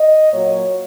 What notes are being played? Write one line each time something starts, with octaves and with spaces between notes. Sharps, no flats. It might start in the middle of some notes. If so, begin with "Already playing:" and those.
Already playing: D#5
A#2 F#3 A#3 C#5